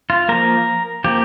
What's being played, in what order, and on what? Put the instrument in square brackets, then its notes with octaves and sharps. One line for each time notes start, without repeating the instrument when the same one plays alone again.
[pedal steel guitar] F4
F3 A#3 A#4
F3 A#3 G4